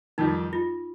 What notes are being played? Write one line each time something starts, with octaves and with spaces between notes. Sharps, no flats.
F2 D#3 G3 D#4
F4